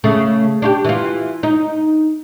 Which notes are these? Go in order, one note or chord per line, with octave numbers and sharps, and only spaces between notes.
C#3 A3
D4 F4 G4
E3 F4
D#4